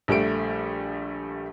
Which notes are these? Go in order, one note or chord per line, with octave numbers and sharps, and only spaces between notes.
A#1 G3 A3 D7